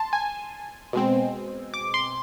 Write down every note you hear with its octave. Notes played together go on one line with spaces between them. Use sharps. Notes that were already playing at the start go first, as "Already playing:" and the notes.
Already playing: A5 C6
G#5
B2 G#3 C4
D6
C6